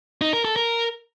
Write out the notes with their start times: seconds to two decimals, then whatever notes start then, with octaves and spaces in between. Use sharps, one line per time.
0.21 D#4
0.33 A#4
0.45 A4
0.56 A#4